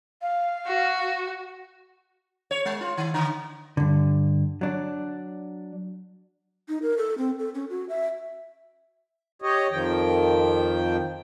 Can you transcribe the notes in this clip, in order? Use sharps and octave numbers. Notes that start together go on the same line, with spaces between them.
F5
F#4
C#5
G#3
F4
D#3
D3
G2 D3
F#3 D4
D#4
A#4
A4
C4
A4
C#4
F#4
E5
G4 C#5 D#5
F2 D#3 F3 G5